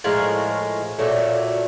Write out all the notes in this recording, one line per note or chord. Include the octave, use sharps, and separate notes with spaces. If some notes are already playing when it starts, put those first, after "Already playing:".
A2 F3 G#3 A#4
A#2 F#3 A3